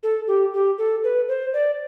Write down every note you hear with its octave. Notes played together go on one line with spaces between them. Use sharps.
A4
G4
G4
A4
B4
C5
D5